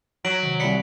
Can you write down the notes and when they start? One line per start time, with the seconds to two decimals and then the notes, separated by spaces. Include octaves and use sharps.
0.25 F#3 B6 D7 F#7
0.43 C3 D#3
0.60 C2 D5 B5 B6 C#7